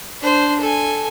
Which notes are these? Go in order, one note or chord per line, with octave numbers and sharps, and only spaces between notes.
D4 C5
A4 G#5